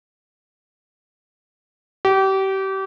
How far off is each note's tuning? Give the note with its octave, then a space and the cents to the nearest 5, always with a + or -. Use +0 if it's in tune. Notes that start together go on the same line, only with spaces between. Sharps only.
G4 -30